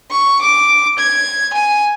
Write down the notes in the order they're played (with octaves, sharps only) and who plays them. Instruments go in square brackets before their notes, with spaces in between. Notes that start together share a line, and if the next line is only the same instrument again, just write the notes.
[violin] C#6
D6
G#6
G#5